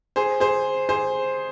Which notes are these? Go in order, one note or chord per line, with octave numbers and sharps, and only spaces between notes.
G#4 C5
G#4 C5
G#4 C5